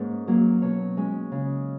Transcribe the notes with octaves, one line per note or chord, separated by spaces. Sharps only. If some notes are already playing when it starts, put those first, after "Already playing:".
Already playing: G#2 A#3 C#4 B4
F#3 A#3
B2 C#5
G#3 C#4
C#3